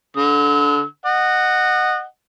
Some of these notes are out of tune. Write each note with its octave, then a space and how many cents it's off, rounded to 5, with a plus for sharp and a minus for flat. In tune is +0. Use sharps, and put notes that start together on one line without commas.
D3 -20 E6 -40
D#5 -20 F#5 +0